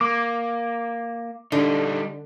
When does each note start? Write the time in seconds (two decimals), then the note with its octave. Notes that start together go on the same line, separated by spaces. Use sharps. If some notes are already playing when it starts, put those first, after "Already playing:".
0.01 A#3 D6
1.52 D3 G3 D#4